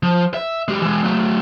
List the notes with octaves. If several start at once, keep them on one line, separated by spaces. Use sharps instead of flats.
F3
E5
G#3 G4
E3 G#3
F#3 A3